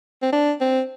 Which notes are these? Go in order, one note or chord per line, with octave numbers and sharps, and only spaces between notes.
C4
D4
C4